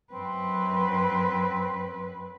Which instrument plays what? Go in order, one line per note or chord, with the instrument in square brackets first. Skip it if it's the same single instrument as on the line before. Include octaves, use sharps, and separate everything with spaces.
[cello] F#2 B4 [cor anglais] C4